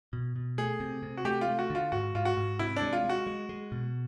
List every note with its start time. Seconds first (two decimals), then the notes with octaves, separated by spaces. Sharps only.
0.13 B2
0.36 B2
0.58 A3 G#4
0.80 C3
1.03 C3
1.17 F#4
1.25 A3 G4
1.41 F4
1.47 A3
1.59 F#4
1.70 D3 F4
1.92 G#2 F#4
2.15 G#2 F4
2.25 F#4
2.37 G#2
2.59 C3 E4
2.76 D4
2.82 G#3
2.93 F4
3.04 G#3
3.09 F#4
3.27 G#3
3.49 G#3
3.72 B2